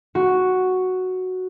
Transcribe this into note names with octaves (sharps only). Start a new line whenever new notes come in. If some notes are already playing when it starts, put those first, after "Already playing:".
F#4